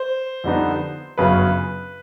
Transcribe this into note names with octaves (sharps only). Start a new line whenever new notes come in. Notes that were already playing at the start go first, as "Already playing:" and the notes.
Already playing: C5
F2 D3 G3 B3 D#4
G1 F#2 C#3 B4